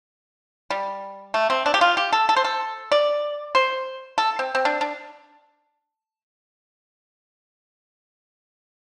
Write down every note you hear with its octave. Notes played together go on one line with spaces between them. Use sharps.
G3
A3
C4
D4
G4
F4
G4
A4
A4
C5
A4
D5
C5
A4
C4
C4
D4
D4